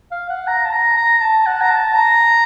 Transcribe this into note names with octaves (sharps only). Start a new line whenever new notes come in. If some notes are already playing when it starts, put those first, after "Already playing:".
F5
F#5
A#5
A5
A#5
A#5
A5
F#5
A#5
A5
A#5